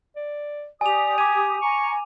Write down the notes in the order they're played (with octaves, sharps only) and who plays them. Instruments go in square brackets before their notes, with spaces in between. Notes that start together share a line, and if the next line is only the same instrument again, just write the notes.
[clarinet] D5
[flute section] G4 D#6 [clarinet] D5 [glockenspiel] G#5 F7
[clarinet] G#5 [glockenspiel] D6 D#7
[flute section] G#5 A#5 [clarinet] C#6